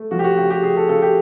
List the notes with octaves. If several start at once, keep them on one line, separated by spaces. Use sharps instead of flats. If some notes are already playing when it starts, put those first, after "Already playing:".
Already playing: A3
F3 F#4
G4
F#4
C#3 G4
G4
C#3 G#4
A4
C#3 A4
G4